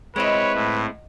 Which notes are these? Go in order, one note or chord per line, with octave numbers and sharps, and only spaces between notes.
G#3 C4 E4 B4 C#5 D#5 F#5
A2